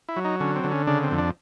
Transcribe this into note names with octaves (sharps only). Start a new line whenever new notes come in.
E4
F#3
D#4
D3 C#4
C4
D3
C#4
C#3 D4
C4
F2
D4